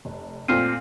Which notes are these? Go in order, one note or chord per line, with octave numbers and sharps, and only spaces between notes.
F1
A#2 A3 C4 F6 C7 D#7